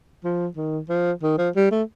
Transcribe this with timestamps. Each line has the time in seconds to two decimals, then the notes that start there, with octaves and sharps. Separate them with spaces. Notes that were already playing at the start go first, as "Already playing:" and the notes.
0.24 F3
0.57 D#3
0.89 F3
1.23 D#3
1.38 F3
1.56 G3
1.71 A3